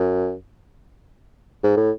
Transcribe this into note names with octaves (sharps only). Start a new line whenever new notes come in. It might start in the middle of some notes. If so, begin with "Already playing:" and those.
Already playing: F#2
G#2
A2